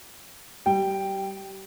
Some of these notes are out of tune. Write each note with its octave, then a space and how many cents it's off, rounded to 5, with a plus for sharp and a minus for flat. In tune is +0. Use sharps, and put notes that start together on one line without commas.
G3 -25 G5 +0